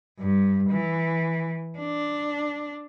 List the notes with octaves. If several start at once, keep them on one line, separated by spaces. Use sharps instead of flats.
G2
E3
D4